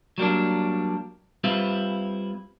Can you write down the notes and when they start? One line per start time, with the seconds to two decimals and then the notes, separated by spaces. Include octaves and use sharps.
0.18 F#3 G3 A#3 D4
1.44 G3 C4 E4 F4 B4